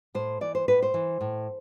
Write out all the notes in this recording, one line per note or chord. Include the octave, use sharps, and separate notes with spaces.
A2 C5
E3 D5
C5
A2 B4
C5
E3
A2